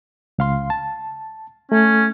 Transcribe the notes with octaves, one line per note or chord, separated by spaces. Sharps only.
C#2 F5 C6
A5
A3 C#4